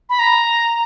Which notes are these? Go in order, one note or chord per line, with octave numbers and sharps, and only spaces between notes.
B5
A#5